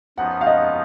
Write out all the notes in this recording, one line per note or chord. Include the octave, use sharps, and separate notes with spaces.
F#2 F3 B3 D#4 F#5
F5
D#5